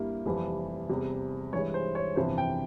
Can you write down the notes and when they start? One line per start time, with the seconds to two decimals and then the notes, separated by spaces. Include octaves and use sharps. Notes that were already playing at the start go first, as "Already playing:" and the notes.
Already playing: G2 G3 A#3 E4
0.25 F1 F2 E3 G3
0.89 E2 C3 G3
1.53 G2 E3 G#3 C#5
1.74 C5
1.95 C#5
2.16 G1 F2 C3 E3 C5
2.38 G5